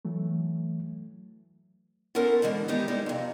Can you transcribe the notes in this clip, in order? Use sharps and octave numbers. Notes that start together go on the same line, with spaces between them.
E3 F#3 A3
B3 C#4 E4 A4 A#4 C5
B2 D3 E3 G#3
D#3 G#3 B3 D#4 E4 G4
G3 G#3 D#4 E4
F2 C3